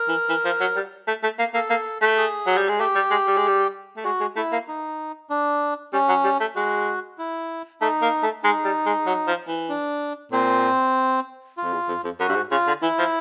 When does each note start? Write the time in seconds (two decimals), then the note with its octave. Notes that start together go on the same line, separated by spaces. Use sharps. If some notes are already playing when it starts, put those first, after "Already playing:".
Already playing: A#4
0.08 E3
0.29 E3
0.45 F3
0.60 F#3
0.76 G3
1.08 A3
1.23 A3
1.39 A#3
1.54 A#3 A4
1.70 A#3
2.02 A3
2.17 G#4
2.47 F#3
2.57 G3
2.69 G#3
2.80 A3 G4
2.95 G3
3.11 G#3
3.27 G3
3.37 G#3
3.47 G3
3.97 A3
4.05 G#3 F#4
4.20 G#3
4.36 A3 E4
4.52 A#3
4.68 D#4
5.30 D4
5.93 G3 C#4
6.09 F#3
6.24 G3
6.40 A3
6.56 G#3 F#4
7.18 E4
7.81 A3 D#4
8.02 A#3
8.23 A3
8.44 G#3 D#4
8.64 G3
8.86 G#3
9.06 F#3
9.27 F3
9.48 E3
9.69 D4
10.32 A#2 C4
11.58 F4
11.63 F2
11.73 E2
11.88 F2
12.04 F2
12.20 F#2 F#4
12.29 G2
12.35 G#2
12.51 C#3 F4
12.67 D3
12.82 E3 E4
12.98 F3